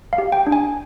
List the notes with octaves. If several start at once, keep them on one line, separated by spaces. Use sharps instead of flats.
F5
G4
G5
D4
G#5